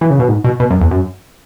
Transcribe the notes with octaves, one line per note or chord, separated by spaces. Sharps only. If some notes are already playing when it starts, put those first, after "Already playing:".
E3
C#3
B2
G#2
B2
B2
F#2
E2
F#2